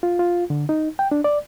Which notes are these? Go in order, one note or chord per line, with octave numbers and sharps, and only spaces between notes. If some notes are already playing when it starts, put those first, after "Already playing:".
F4
F4
D3
D#4
G5
D4
D5